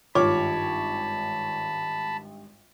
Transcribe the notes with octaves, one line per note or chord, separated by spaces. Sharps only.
G#1 G2 F4 C#5 A5 B5 D6